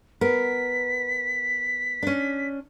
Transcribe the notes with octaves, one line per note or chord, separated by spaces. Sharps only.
B3 A#4 B6
C#4 D4